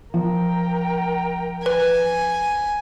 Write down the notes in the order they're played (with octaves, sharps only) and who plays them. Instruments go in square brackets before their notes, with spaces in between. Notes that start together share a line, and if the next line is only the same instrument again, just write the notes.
[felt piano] F3 [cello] A#4 G5
[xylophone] B4 [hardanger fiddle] G#5